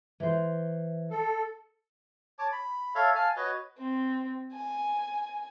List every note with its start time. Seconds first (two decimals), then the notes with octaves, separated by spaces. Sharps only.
0.20 E3 C5
1.11 A4
2.39 C#5 A5 D6
2.52 B5
2.95 A4 C#5 E5 F5
3.15 F5 G#5 A5
3.36 F#4 B4 C#5 D#5
3.78 C4
4.53 G#5